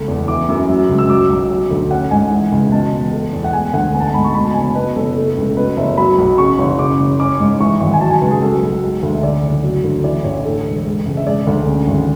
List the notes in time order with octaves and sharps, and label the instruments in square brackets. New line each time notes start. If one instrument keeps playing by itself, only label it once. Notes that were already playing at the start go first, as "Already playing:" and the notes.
Already playing: [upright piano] C#2 A3
E2
E3 D6
F#2
F#3
C#2
E6
F#3 D6
B1
F#3
D2
C#4 F#5
G#2 G#5
E3
C#2
B2 A5
E1
A3
E2
F#5
G#3 G#5
D2 F#5
B3 G#5
A5
G#5
G#2 B5
C#6
B2 B5
A5
F#1 G#5
A5
B2 B4
F#1 A4
A3
C#2
B2 B4
F#1 E5
F#3 B5
B1
C#3 C#6
F#1
C#3 D6
F#1
C#4 D6
G#2
E3 C#6
G#1
G#5
F#3 A5
G#5
C#2 B4
G#4
F#3 A4
B1
G#3
D2
E5
D3 D5
F#1
F#3
D2
E3 D5
A1 C#5
D3 A4
E1
G#3
C#2
E5
G#3 D5
D2
C#3
G#1